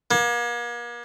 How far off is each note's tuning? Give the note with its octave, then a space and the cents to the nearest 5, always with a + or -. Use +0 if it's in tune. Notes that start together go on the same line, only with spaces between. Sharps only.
A#3 +40